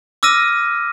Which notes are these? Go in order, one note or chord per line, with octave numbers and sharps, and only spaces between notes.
D6 E6 F6 A#6 D#7